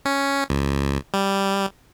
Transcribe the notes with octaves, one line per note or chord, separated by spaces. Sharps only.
C#4
C#2
G3